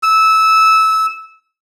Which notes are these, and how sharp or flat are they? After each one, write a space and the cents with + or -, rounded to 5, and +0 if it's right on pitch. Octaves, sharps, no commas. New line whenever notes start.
E6 -15